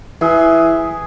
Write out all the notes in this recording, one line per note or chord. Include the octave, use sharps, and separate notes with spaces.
E3 G#4 E5